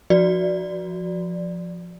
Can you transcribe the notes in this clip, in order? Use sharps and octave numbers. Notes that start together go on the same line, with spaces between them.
F3 F#4 D5